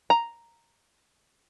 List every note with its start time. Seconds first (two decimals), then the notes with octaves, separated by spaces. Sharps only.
0.10 A#5